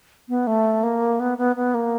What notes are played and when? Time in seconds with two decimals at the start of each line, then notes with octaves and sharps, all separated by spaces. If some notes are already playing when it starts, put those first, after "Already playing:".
0.29 B3
0.47 A3
0.83 A#3
1.20 B3
1.38 B3
1.56 B3
1.74 A#3